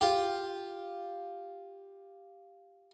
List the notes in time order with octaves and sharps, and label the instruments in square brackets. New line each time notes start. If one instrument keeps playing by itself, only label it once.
[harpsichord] F4 G4